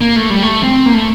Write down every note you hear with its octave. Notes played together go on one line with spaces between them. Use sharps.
A#3
A3
G3
A3
C4
A#3
A3